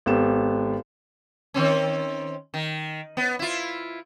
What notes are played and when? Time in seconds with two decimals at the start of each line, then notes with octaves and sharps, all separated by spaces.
0.06 G#1 B3 G4 A4 E7
1.54 D#3 C4 C#4
2.54 D#3
3.17 B3
3.39 E4 F4